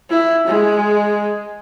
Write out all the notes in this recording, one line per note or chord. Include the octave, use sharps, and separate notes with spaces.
E4
G#3